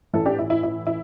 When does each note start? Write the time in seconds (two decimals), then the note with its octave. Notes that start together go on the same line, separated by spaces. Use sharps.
0.13 A1 A2 E3 E4 A4
0.25 D4 G4
0.39 E4
0.50 E4
0.63 E4
0.87 E4